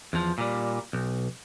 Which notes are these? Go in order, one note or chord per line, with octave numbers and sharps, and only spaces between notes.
E2 F3
A#2 G3
B1